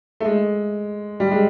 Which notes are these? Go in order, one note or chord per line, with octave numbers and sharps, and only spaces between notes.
A3
G#3
G3
G#3